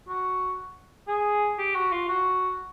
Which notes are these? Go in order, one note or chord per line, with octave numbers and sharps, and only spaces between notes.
F#4
G#4
G4
F#4
F4
F#4